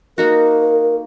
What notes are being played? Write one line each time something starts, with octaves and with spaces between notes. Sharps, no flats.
A#3 D#4 F#4 A#4